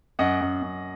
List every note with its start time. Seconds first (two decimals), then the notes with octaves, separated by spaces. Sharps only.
0.19 F#2 D#5 F#5
0.41 F#2
0.62 F#2